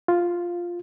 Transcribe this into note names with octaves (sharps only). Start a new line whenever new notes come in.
F4